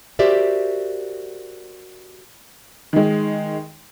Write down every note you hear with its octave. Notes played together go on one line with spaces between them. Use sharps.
F#4 G4 A#4 C5 D5 E5
D#3 G#3